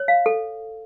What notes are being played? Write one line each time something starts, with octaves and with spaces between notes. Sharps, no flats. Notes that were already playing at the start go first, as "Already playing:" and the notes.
Already playing: C#5
F5
A4